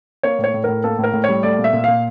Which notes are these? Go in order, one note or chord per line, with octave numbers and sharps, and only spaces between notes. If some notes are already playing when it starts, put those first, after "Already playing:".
A#3 C#5
A2
C#5
A2
A2 A#4
A#3 A4
A2
A#4
A2
C#5
G3
A3 D5
A#2
E5
A#2
A#2 F5